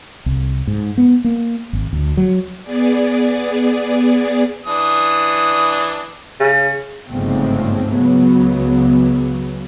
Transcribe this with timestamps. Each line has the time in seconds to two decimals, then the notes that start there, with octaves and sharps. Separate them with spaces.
0.26 C2
0.67 G#2
0.98 B3
1.24 A#3
1.73 G#1
1.93 D2
2.17 F#3
2.63 B3 G#4 D5
4.66 E3 D4 D#6
6.40 C#3
7.09 G1 G#2 C#3 F3 A3 C4
7.90 C#2 C#3 F#3 B3